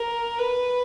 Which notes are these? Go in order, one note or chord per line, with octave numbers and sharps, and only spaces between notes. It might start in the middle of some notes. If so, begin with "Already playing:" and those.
Already playing: A#4
B4